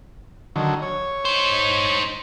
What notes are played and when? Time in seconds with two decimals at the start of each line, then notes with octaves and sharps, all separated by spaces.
0.56 D3 D#3 F#3
0.82 C#5
1.25 D#4 C5